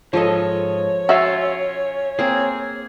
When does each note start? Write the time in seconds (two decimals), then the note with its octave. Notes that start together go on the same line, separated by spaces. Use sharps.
0.13 G#2 F3 A4 C#5 D#5
1.09 C#4 F4 F#4 E5
2.19 A#3 C4 G#4